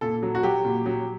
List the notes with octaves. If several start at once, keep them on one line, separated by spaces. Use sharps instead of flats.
A#2 A4
F#3
F#4
F#3 G4
A#2
F#3